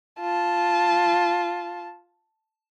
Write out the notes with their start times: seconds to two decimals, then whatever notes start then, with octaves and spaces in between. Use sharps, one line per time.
0.20 F4 A5